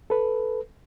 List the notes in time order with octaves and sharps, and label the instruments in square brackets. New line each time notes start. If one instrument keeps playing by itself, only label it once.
[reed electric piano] A4 B4